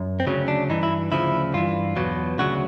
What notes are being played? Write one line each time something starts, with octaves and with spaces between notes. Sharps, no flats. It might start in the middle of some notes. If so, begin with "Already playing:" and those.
Already playing: F#2
C4
D2 C#3 F#3 C#4
D4
G2 E3 D#4
E4
D2 C#3 F3 E4
G2 E3 F4
E2 B2 F#3
D2 C#3 F#3 F#4